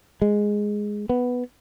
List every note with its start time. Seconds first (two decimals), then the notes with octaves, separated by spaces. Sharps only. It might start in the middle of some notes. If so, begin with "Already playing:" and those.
0.22 G#3
1.09 B3